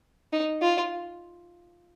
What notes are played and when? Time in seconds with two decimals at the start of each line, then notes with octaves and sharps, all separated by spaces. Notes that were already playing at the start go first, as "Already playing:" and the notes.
0.33 D#4
0.62 F4